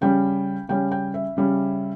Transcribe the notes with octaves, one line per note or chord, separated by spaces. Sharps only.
C#3 G3 C#4 G5
C#3 G3 C#4 G5
G5
E5
C#3 G3 C#4